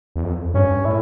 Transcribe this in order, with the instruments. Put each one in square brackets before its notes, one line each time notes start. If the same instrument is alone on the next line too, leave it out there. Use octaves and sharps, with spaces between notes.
[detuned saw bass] E2
F2
[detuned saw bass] G2 [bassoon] C#4
[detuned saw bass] A2 [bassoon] E4